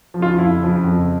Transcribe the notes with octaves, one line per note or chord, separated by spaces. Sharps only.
F3
C#3 F4
F2 E4
C#3 F3
F2